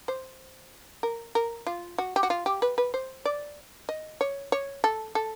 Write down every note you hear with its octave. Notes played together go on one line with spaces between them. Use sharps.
C5
A#4
A#4
F4
F#4
G4
F#4
F4
G4
B4
B4
C5
D5
D#5
C#5
C#5
A4
A4